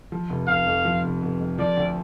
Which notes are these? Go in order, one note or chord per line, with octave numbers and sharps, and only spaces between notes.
F3
F1
F1 F5
F2
F3
F1
F1
F2
F3 D5
D2